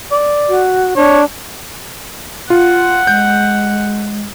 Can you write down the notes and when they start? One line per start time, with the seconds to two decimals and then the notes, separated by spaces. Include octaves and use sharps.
0.11 D5
0.49 F#4
0.96 D4 C#5
2.50 F4 F#5
3.07 G#3 G6